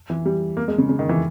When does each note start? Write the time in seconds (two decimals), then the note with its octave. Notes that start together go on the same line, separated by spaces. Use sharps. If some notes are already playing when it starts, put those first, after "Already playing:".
0.10 E3
0.26 G3
0.57 A#3
0.68 G#3
0.78 C#3
0.89 C#3
0.99 D#3
1.09 E3